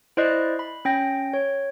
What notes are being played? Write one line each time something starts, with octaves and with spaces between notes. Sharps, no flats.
E4 C5 D5 D#5 F#6 C7
B5
C#4 G5 A#6
C#5